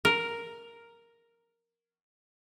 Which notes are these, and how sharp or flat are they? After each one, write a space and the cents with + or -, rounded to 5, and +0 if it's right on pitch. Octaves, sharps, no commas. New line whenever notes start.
A#4 +0